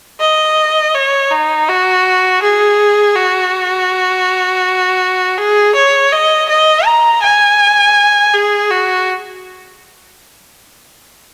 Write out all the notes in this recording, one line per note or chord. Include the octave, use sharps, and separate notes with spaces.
D#5
C#5
D#4
F#4
G#4
F#4
G#4
C#5
D#5
D#5
A#5
G#5
G#4
F#4